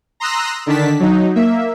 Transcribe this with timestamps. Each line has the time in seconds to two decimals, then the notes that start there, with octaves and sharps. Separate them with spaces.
0.20 A#5 C6 D#6 E6 F#6 A#6
0.66 D3 D#3 D4 A5 B6
1.00 F#3 D#4
1.35 A#3 E5